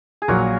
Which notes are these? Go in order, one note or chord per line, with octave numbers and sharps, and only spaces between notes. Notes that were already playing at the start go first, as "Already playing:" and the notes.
G#4
A#1 A#2 F#3 F#4 A#4